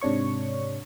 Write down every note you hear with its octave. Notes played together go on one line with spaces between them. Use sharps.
G#2 C3 D4 C#5 C#6